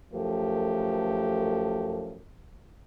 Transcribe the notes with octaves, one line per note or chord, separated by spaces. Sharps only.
F#2 F3 A3 G4 A4 A#4